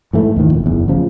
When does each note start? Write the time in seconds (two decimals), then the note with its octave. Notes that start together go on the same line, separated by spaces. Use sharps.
0.13 G#2 E3 A3
0.36 D#2 A2 D#3 F3
0.53 E1
0.66 F#1 E2
0.88 A1 C#3 F3